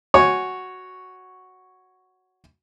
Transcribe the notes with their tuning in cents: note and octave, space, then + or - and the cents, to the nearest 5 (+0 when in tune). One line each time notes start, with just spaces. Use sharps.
F#4 +0 C#5 +0 G#5 +0